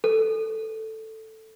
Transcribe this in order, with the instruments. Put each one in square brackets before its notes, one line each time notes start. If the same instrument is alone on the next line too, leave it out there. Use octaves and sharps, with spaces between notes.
[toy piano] A4